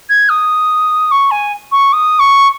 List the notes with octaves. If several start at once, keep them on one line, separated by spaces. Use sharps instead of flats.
G#6
D#6
C#6
G#5
C#6
D#6
C#6